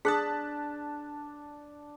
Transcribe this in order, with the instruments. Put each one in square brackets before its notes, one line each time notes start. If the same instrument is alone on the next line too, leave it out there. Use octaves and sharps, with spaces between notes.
[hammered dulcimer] D4 [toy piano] G#4 D#6 [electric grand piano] A5 F#6 B6